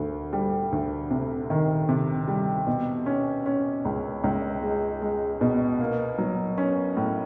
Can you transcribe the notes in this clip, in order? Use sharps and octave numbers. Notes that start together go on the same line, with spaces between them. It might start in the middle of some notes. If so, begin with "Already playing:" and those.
Already playing: D2
G3
D2
C3
D#3
C3
G3
B2
C#4
C#4
C#2
C#2
G#3
G#3
B2
A#3
F#3
C#4
A2